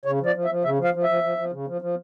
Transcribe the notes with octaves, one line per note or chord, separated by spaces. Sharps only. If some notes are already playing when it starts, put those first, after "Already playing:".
C#3 C#5
F3
D5
F3
E5
F3
C#3 E5
F3
F5
F3
E5
F3
F3
F3
C#3
F3
F3